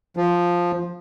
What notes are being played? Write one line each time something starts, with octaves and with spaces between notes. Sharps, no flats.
F3